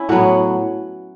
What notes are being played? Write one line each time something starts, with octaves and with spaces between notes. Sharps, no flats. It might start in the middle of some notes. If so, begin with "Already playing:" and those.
Already playing: C#4 E4
A2 F#3 B3 F#4